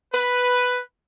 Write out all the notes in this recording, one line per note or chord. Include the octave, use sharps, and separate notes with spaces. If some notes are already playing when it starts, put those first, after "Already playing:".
B4